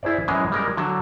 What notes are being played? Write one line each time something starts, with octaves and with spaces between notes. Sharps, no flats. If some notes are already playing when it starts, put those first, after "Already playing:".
E4 G#4 C5 D5
F#2 E3 G#3 G#4
G3 G#3 A#4
D3 F#3 A5